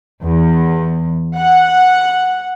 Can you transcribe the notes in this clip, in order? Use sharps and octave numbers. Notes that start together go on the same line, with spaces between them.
E2
F#5